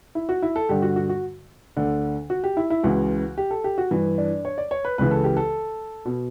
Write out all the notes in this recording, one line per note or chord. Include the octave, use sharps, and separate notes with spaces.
E4
F#4
E4
A4
G2 D3 G4
F#4
F#4
F#4
D2 D3
F#4
G4
E4
E4
C#2 C#3 E3 F#4
G4
A4
G4
F#4
G2 E3
D4
C#5
D5
C#5
B4
C#2 C#3 E3 B4
A4
G4
A4
B2